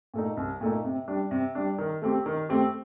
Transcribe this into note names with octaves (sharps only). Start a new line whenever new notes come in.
A#2 A3 D#4
C2
A#2 A3 D#4
C3
G3 D4
C3
G3 D4
D#3
A3 C4 G4
D#3
A3 C4 G4